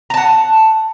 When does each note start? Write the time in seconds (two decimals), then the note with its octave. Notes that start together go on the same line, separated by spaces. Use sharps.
0.10 A#5
0.14 A5
0.17 F#5